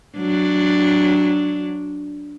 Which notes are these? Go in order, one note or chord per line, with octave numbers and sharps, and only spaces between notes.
F#3 D4